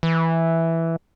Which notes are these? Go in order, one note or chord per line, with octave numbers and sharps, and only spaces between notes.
E3